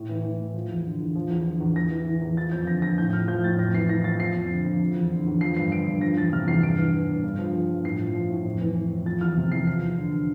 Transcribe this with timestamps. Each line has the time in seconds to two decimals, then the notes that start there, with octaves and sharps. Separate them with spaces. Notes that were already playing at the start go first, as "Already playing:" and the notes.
Already playing: A2
0.09 E3
0.23 E3
0.40 A2
0.54 F3
0.69 E2
0.85 D3
1.00 E2
1.15 F3
1.30 E2
1.46 D3
1.61 E2
1.75 E2 A#6
1.91 E3
2.06 E3
2.22 E2
2.37 F3 A6
2.52 F2 G6
2.67 D3 A#6
2.82 F2 A#6
2.98 A2 G6
3.13 F3 F6
3.28 F3 G6
3.44 A2 A6
3.58 F2 A#6
3.74 E3 C7
3.89 E3 A#6
4.04 F2 A6
4.19 F3 C7
4.34 F2
4.50 D3
4.65 F2
4.80 F3
4.95 E2
5.11 D3
5.26 E2
5.41 F3 C7
5.57 G2 C7
5.72 D3 D7
5.87 G2
6.01 F3 A#6
6.17 E2 A6
6.32 C3 F6
6.48 E2 C7
6.63 G2 D7
6.78 E3
6.94 E3
7.09 G2
7.24 G2
7.39 F3
7.54 F3
7.70 G2
7.84 A2 C7
8.00 F3
8.15 F3
8.30 A2
8.45 F2
8.61 E3
8.76 E3
8.91 F2
9.06 F3 A6
9.21 E2 F6
9.36 C3
9.52 E2 C7
9.67 F3 C7
9.83 E2
9.98 D3